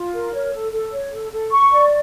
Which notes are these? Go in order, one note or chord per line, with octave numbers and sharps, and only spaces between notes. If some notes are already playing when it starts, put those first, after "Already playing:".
Already playing: F4
A#4
C#5
A4
A4
C#5
A4
A4
C#6
D5